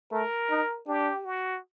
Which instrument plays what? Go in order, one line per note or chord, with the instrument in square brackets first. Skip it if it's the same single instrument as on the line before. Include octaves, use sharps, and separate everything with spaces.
[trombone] A3 [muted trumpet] A#4
[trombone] D#4
[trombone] D4 [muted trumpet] G4
[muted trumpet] F#4